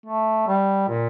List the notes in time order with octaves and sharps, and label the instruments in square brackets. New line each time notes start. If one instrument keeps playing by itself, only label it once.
[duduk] A3
G3
A#2